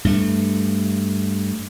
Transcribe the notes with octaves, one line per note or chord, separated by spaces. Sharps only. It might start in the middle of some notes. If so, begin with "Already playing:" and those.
G2 A3